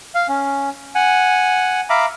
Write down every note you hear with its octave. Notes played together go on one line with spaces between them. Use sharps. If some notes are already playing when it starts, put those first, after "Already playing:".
F5
C#4
F#5 G#5
E5 F5 A#5 B5 D6